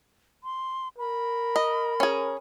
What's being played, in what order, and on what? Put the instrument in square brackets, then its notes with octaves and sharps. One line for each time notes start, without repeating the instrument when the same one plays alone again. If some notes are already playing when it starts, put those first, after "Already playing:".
[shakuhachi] C6
[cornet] A#4 [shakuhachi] B5
[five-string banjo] D#5
C#4 G#4